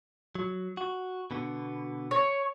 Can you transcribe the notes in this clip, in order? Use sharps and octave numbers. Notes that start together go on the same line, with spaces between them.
F#3
F#4
B2 D3 B3
C#5